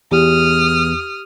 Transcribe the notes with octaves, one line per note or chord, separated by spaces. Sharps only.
E2 G4 D#6 F6